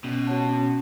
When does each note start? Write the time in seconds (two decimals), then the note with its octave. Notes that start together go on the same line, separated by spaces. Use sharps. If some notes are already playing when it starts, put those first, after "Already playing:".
0.04 B2 C#4
0.27 F#4 C#5 F#5 A5
0.49 C#4